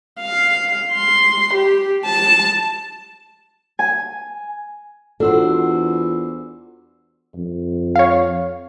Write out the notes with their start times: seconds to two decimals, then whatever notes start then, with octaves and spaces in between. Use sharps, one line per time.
0.20 F5
0.93 C6
1.54 G4
2.05 A5
3.79 G#5
5.20 E2 D4 F4 F#4 A4 C5 E6
7.35 F2
7.96 C#5 F5